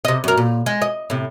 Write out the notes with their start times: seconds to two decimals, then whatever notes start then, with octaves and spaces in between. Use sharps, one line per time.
0.05 C3 D#5
0.24 F#2 A#4
0.37 A#2
0.66 G#3
0.82 D#5
1.10 A2 C3